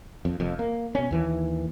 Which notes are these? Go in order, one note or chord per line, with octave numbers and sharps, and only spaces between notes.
F2
F1 F2
A#3
B2 C#4
D#2 E3